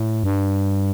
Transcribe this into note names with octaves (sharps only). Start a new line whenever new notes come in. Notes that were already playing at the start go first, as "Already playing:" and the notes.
Already playing: A2
G2